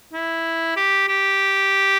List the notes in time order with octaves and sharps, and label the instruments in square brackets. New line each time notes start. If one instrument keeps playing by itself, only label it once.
[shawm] E4
G4
G4